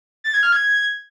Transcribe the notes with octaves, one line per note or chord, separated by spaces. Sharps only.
A6
G#6
F6
G#6